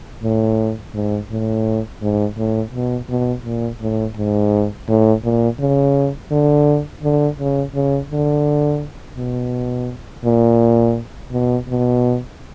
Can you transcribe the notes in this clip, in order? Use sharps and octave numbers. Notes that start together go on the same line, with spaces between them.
A2
G#2
A2
G#2
A2
B2
B2
A#2
A2
G#2
A2
A#2
C#3
D3
D3
C#3
C#3
D3
B2
A#2
B2
B2